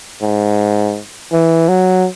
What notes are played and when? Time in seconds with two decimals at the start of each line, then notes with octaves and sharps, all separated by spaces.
0.22 G#2
1.32 E3
1.69 F#3